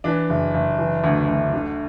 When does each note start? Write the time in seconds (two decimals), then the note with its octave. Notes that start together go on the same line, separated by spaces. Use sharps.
0.04 E3 D4
0.29 F#1
0.54 F#1
0.79 E3
1.04 D2
1.28 D2
1.53 D3